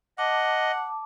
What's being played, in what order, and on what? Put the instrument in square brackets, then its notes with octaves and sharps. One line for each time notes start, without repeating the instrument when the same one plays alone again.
[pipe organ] D#5 [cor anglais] F#5 [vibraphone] A5 D6